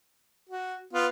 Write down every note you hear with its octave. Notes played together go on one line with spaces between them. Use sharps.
F#4
B3 F4